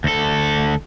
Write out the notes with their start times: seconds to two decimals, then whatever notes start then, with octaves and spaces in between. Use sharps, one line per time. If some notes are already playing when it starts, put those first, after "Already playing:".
0.04 D2 A4